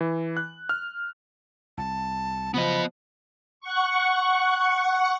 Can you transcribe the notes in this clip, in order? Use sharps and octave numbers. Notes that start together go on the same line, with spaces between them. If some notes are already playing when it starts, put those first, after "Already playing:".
E3
F#6
F6
C2 A5
C#3 F3 F#3 B3 D#5 B5
F#5 C#6